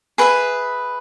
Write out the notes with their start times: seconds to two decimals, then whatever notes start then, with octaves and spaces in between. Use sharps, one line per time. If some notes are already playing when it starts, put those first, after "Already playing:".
0.18 G#4 B4 E5